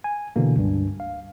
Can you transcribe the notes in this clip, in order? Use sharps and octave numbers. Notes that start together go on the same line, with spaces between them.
G#5
B2 D3 E3 A#3
C#2 G2
F5